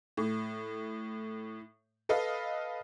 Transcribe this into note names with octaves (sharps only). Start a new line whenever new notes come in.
A2
A4 B4 D#5 F5